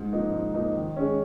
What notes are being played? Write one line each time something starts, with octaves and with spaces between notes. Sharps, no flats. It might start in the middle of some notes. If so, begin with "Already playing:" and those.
Already playing: G#2
F3 A#3 D#4
G#2
F3 A#3 D#4
D#3
G#3 C#4